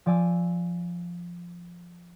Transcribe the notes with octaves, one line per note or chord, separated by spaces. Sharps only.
F3 D5 G#5 E6